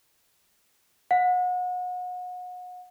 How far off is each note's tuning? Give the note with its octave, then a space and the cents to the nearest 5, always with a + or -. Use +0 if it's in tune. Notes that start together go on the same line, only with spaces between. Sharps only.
F#5 -35